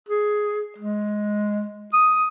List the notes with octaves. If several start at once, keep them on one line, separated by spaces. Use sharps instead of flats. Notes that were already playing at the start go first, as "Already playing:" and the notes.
G#4
G#3
D#6